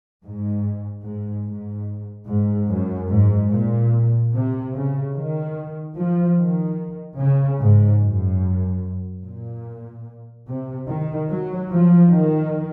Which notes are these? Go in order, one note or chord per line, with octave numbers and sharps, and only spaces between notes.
G#2
G#2
G#2
G#2
F#2
G#2
A#2
C3
C#3
D#3
F3
D#3
C#3
G#2
F#2
A#2
C3
D#3
F#3
F3
D#3